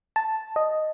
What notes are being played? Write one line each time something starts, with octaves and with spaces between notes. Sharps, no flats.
A5
D#5